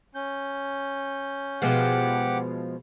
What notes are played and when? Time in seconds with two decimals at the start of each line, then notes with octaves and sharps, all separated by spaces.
0.15 C#4 G6
1.62 B2 F3 G#3 G4 F#5 D6